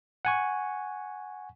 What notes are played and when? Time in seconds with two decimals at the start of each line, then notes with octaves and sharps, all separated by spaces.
0.25 F#5 G#5 C#6